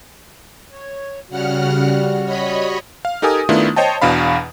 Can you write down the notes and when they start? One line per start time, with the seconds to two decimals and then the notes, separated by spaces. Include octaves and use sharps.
0.72 C#5
1.30 C#3 G3 F#4 F#5 F6
2.25 C#5 D#5 B5
3.05 F5
3.22 D#4 G4 A4 A#4 G#5 D#6
3.49 D#3 A3 B3 D4 E4 F4
3.76 C5 C#5 D#5 G5 A5
4.02 E2 B2 D4 F5 B5